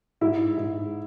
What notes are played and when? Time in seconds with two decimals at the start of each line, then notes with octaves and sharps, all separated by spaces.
0.21 G#2 E4
0.57 G#2